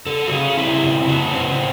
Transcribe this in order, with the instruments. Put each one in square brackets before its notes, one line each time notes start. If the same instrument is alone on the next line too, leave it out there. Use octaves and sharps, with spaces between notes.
[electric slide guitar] C#3 A4
F#4
C#3 G#4
C4 E4
C#3
C#3 F#4
C4